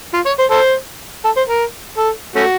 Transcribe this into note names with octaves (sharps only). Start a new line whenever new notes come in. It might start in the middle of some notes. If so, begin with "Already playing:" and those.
F4
C#5
C5
A4 C5
A4
C5
A#4
A4
A3 C#4 F#4